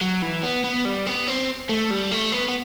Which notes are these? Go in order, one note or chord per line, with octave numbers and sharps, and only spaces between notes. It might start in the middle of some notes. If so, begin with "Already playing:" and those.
F#3
E3
B3
B3
G3
B3
C4
A3
G3
A3
B3
B3